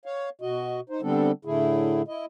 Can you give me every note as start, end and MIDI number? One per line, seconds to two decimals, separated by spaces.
0.05 0.29 73
0.05 0.29 77
0.41 0.81 47
0.41 0.81 66
0.41 0.81 75
0.90 1.01 63
0.90 1.01 72
1.02 1.32 50
1.02 1.32 55
1.02 1.32 59
1.02 1.32 60
1.02 1.32 62
1.02 1.32 69
1.45 2.02 45
1.45 2.02 50
1.45 2.02 57
1.45 2.02 64
1.45 2.02 68
2.08 2.26 64
2.08 2.26 75